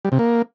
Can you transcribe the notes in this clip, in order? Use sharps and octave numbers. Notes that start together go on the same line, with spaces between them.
G3
C3
A#3